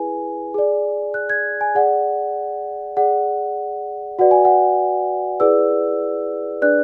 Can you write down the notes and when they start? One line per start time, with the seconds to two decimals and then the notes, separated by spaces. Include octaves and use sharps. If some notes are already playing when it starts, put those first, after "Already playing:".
Already playing: E4 G#4 B4 G#5
0.54 G#4 D5
1.14 F#6
1.30 G#6
1.61 G#5
1.75 G#4 D5 F#5
2.97 G#4 D5 F#5
4.19 F#4 B4 D5 F#5
4.31 G#5
4.45 F#5
5.40 E4 G#4 B4 D5 E6
6.62 D4 G#4 B4 D5 F#6